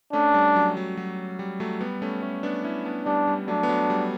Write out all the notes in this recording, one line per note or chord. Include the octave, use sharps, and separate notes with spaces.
A3 C#4 D4
G3
F#3
F#3
F#3
G3
F#3 A3
G3 B3
A3 C#4
A3 C#4
B3 D4
C#4 E4
B3 D4
G3 D4
G3
F#3 A3 D4
B3
F#3 A3
G3